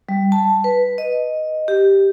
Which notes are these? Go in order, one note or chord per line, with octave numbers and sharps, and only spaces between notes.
G3
A5
B4
D#5
G4